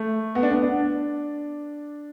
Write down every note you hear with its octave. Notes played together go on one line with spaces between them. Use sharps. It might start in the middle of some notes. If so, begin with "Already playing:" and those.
Already playing: A3
B3
D4
B3
D4